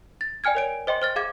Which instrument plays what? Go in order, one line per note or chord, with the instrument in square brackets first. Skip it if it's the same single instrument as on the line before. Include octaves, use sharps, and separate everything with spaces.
[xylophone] A6
D5 G5 G#5 F6 G#6
A#4 C#5 D7
C5 D#5 G5 C6
C5 F6 A6
G#4 F5 D6 G#6